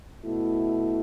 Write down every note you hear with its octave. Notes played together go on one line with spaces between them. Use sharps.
B2 A3 E4